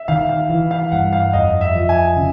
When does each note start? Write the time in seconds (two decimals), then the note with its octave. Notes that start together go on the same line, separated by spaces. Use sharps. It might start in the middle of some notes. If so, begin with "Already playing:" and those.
Already playing: E5
0.08 D#3 F5
0.29 F5
0.50 E3
0.71 F5
0.92 G2 F#5
1.13 F5
1.33 F2 D#5
1.61 E5
1.75 F3
1.89 G#5
2.17 C#3